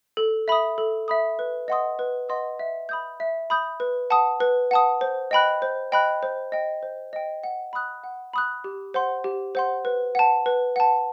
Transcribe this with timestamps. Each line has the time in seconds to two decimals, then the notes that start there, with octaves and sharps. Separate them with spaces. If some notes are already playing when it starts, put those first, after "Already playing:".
0.17 A4
0.48 E5 B5 D#6
0.78 A4
1.08 E5 B5 D#6
1.39 B4
1.68 D#5 F#5 C6 D#6
1.99 B4
2.29 D#5 F#5 C6 D#6
2.59 E5
2.89 B5 D#6 G6
3.20 E5
3.50 B5 D#6 G6
3.80 B4
4.10 F#5 A5 D#6
4.40 B4
4.71 F#5 A5 D#6
5.01 C5
5.31 D#5 G5 B5 F#6
5.62 C5
5.92 D#5 G5 B5 F#6
6.23 C5
6.52 D#5 G5
6.83 C5
7.13 D#5 G5
7.44 F#5
7.73 B5 D#6 F#6
8.04 F#5
8.34 B5 D#6 F#6
8.64 G4
8.94 C5 F#5 C6
9.24 G4
9.55 C5 F#5 C6
9.85 B4
10.15 F#5 A5
10.46 B4
10.76 F#5 A5